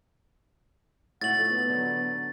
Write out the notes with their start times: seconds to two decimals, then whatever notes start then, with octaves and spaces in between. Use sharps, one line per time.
1.21 A2 D#4 F#4 F#5 A6 F#7
1.38 F3 A4
1.49 B3
1.69 D3 F#3